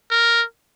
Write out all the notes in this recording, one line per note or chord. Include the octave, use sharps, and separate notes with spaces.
A#4